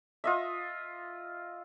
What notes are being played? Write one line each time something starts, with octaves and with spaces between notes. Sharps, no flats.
F4 D#5 E5